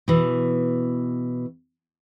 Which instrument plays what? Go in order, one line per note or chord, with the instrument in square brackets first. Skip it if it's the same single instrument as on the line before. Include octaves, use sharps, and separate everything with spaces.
[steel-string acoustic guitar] B2 E3